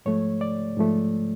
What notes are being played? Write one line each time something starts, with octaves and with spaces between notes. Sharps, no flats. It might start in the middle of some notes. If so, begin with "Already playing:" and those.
G#2 F3 A3 C#5
D5
G#2 F3 A3